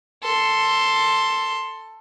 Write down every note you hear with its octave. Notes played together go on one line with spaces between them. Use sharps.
A4 C6